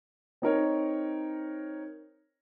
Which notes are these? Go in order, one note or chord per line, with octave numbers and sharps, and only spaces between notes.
C4 D#4 A#4 C#5